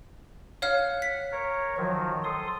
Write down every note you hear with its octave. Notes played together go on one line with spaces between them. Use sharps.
C#5 F5 F#5 F6
B6
A#4 C#5
D#3 F3 F#3
A4 C6 D#6